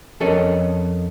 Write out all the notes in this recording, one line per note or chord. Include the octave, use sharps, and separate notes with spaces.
F2 C#4 A4 A#4 D#5